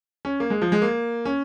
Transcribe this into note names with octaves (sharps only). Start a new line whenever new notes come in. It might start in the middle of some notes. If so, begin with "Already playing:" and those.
C#4
A#3
G#3
F3
G#3
A#3
C#4